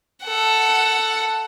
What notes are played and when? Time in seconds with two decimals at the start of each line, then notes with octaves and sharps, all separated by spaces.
0.23 A4 F#5